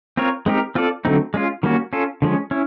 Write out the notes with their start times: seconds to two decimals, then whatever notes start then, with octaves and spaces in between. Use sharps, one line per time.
0.17 C4 F4 A#4 C#5
0.46 G#3 C4 D#4 G4 A#4
0.75 C4 F4 A4 D5
1.05 D3 F#3 A3 C4 D#4
1.34 G#3 C#4 F4
1.63 D#3 G3 A#3 C#4 F#4
1.93 C#4 F4 A4
2.22 D3 F3 G#3 C#4
2.51 C#4 E4